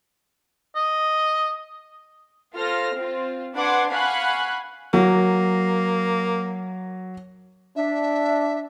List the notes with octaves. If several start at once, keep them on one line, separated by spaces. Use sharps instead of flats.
D#5
F4 A4 C5 F6 A#6
C4 F4
D4 B4 F#5 C6 D6 G#6
F5 F#5 G#5 B5 C#6 F#6
F#3 A#3
D4 E5